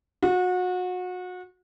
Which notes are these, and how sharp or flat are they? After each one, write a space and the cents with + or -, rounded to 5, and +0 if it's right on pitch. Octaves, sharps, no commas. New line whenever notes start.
F#4 -30